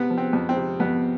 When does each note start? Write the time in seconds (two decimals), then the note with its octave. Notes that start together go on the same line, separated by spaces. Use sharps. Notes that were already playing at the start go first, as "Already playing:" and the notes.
Already playing: C3 B3
0.10 F3
0.18 C4
0.33 F2
0.49 C4
0.57 C3
0.80 F2 B3